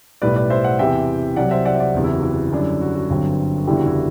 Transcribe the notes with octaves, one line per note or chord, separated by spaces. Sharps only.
B1 A2 G3 B4 D5
B4 D5
C5 E5
D5 F#5
E2 C3 E3 E5 G5
C2 C3 F#3 D5 F#5
C5 E5
D5 F#5
E5
D5 F#5
F#1 E2 C3
E4
F#4
E4
F#2 D3 G3 D4
F#4
F#4
G1 G2 D3 F#3 C4
F#1 E2 D3 G3 D4 E4 G4
F#4
E4 G4